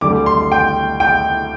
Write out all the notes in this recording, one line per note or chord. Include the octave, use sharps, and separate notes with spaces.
D2 D3 G3 D6
C6
G5
G5